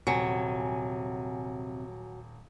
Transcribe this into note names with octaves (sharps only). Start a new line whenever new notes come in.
D#1 C3 F#3 G#5 C#7